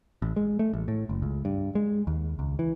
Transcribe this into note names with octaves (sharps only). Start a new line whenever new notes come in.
A1
G#3
A3
A1
A2
F#1
C#2
G2
G#3
D#2
C#2
E3